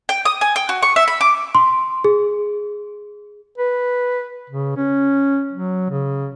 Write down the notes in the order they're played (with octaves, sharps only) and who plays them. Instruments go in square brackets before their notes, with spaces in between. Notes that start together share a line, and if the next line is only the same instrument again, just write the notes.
[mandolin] G5
D#6
G#5
G5
F#4
C#6
E5
B5
D6
[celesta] C6
G#4
[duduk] B4
C#3
C#4
F#3
C#3